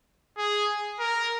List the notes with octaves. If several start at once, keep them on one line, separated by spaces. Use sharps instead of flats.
G#4
A#4